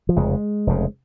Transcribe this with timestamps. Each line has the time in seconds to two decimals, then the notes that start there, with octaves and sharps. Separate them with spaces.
0.09 F3
0.16 F1 F2 C#3 G#3
0.67 F1 F2 C#3